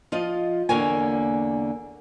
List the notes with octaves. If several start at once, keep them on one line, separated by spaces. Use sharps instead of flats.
F3 F4 D#5
E2 D3 A#3 C#5 G#5